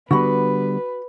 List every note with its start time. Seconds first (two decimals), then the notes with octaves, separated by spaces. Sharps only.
0.11 D3 G3 B3 F#4 B4 B5